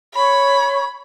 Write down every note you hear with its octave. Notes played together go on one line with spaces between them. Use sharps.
C#5 B5 C#6